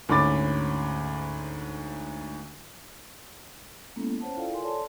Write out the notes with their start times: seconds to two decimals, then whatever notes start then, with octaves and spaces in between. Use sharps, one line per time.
0.09 D2 G#2 C#4 B5 D6 A6
3.96 G#3 A#3 B3 C#4 E4 A4
4.21 C#4 C5 C#5 F#5 A5
4.37 E4 F4 A4 D5 F5 G5
4.50 F4 G#4 A#4 G#5 C6
4.61 A4 C#5 D5 A5 C6